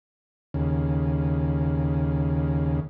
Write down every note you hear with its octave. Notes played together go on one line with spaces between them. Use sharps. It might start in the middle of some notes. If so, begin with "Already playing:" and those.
D#2 C#3